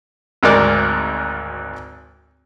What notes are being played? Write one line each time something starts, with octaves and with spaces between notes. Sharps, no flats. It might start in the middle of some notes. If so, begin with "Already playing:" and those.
G#1 D2 G#3 A#4 D5 F#6